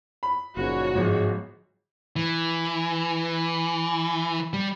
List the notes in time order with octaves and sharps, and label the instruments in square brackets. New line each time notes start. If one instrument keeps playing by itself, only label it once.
[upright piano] B5
[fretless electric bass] F#1 C#3 [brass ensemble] A#2 F3 D#4 [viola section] F#4 C#5
[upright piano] G1 [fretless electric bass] G#2 F3 F#3 [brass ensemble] G#3
[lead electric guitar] E3
G3